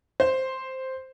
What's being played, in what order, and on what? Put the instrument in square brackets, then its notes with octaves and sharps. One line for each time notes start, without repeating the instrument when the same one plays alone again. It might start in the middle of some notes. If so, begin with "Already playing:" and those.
[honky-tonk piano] C5